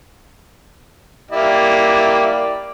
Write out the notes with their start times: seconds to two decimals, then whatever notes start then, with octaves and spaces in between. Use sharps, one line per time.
1.31 A#3 E4 G4 D5